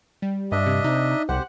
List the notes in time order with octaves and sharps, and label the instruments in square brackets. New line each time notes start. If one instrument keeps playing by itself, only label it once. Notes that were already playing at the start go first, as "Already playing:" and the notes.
[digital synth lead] G3
[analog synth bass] G2 [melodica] D4 D#5 E5
[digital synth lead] C3
[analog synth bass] C3 [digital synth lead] D#4
[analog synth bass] C2 [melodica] G4 C5 [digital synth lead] F#5